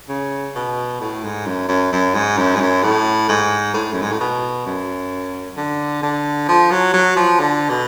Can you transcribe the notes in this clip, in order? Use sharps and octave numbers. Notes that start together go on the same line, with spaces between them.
C#3
B2
A2
G#2
F#2
F#2
F#2
G#2
F#2
G#2
F#2
A2
G#2
A2
F#2
G#2
A2
B2
F#2
D3
D3
F3
F#3
F#3
F3
D3
B2